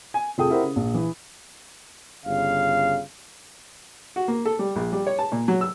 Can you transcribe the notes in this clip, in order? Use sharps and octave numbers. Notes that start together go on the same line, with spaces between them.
G#5
F1 F4 G#4 A4 G5 D#6
E4 G4 A#4 C5 F#5
C#3
A#1
E3
G1 C#3 F5
F#4
A#3
A4
G3
A#1
G3
C#5
A5
A#2
F#3
E6